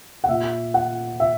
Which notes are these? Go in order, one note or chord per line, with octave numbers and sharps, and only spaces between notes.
F#5
A#2 E5
F#5
E5